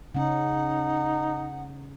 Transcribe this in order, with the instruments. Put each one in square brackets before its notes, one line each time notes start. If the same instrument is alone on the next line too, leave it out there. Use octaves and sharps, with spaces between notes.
[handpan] C#3 C#4 [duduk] D#4 [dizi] F#5